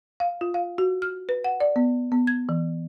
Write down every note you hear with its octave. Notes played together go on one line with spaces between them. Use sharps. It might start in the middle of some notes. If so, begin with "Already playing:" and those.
F5
F4
F5
F#4
F6
B4
F#5
D5
B3
B3
G#6
E3